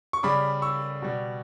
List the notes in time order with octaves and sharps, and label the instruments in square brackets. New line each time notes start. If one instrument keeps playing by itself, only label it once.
[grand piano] C#6
C#3 G3 B5 D6
C#6 E6
B2 G3